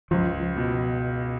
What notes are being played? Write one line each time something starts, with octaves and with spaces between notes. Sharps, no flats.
C#2 F3
B2